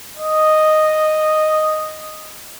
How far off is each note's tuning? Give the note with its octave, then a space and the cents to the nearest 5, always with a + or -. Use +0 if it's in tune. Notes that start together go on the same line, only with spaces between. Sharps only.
D#5 -5